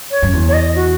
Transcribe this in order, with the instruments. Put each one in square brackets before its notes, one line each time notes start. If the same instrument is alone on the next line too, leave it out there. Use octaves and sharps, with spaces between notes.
[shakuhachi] C#5
[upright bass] F#2
E2
[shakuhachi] C#5
D#5
F#4